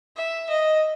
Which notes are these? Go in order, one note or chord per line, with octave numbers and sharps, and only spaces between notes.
E5
D#5